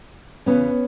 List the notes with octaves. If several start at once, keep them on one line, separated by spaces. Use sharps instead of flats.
E2 C#3 E3 B3 C#4